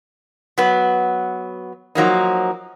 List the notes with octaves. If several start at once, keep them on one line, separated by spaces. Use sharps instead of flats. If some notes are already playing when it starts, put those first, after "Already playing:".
F#3 B3
F3 F#3 A#3 D#4